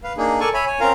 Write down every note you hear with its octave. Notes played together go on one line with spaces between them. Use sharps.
B4 F5
A#3 D4 D#4 G#4
A4 A#4 D5 G#5 A5 C#6
C#5 E5 G#5 B5
C#5 G#5
C4 C#4 F4 A#4 F5 A#5